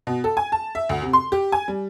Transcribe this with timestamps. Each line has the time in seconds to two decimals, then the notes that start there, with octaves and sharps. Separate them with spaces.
0.07 B2
0.24 A4
0.37 G#5
0.52 A5
0.75 E5
0.89 D2
1.02 C3
1.13 C6
1.32 G4
1.52 G#5
1.68 G3